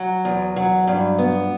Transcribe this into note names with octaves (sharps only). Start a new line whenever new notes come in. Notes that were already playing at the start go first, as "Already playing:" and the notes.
Already playing: F#3
E2
F#3
G2
B3